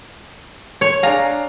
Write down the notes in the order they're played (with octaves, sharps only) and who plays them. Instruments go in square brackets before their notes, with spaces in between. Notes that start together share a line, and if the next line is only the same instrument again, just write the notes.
[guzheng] C#5
[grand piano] D4 G#4 F5 [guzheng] A#5